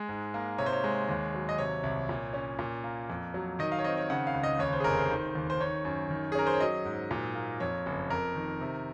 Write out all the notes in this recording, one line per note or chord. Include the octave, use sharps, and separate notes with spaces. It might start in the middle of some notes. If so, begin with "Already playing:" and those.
Already playing: G#3
G#2
A#3
C3 C#5
C5
C#5
G#3
D#2
F#3
D#5
C3 C#5
C2
A#2
C#4
A#2
A#3
F2
F#3
D#3 D#5
F5
C#5
C4 D#5
C#5
C#3 F#5
F5
C#2
D#5
D#2 C#5
C5
G#4
F1 A#4
C5
D#3
D#2
C5
D#3 C#5
F#2
D#3
G#4
C#4 A#4
C5
C#5
F#3 D#5
G#2
A#2
A#3
F2 C#5
F#1
F2 A#4
D#3
C3